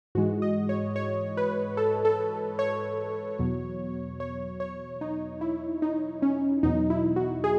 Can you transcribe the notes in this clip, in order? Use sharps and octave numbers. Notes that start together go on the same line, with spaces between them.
G#2 E3 G#3 F#4
D#5
C#5
C#5
B4
A4
A4
C#5
E2 B2 F#3
C#5
C#5
D#4
E4
D#4
C#4
E2 B2 F#3 D#4
E4
F#4
G#4